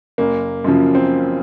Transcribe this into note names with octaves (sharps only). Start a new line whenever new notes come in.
F#1 A#3
F#2 C#3 F3
C4